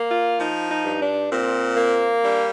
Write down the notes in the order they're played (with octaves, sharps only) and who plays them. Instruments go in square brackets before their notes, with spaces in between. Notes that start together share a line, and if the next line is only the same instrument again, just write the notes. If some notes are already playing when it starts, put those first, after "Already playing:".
Already playing: [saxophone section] A#3
F4
F3 D#4
D#4
G2
D4
A#2 C4
A#3
G3 D4